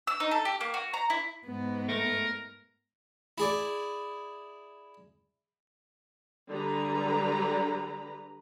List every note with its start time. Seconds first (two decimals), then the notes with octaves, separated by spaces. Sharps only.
0.07 E6
0.20 D#4
0.31 A4
0.45 G4
0.61 A#3
0.74 F#4
0.94 A#5
1.10 E4
1.47 G#2 B3
1.89 A3 A#4
3.38 E4 G#4 D5
6.49 D3 G3 G#4 B4 A#5